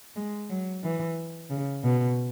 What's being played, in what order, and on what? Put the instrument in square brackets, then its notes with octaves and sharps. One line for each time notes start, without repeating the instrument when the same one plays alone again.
[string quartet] G#3
F#3
E3
C#3
B2